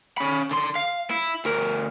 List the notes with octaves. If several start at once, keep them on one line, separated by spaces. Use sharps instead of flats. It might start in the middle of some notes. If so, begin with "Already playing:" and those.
C#4 B5
D3 C6
F5
E4
D2 A#4